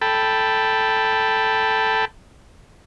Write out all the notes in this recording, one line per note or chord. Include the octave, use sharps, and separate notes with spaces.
A4 G5 A5 B5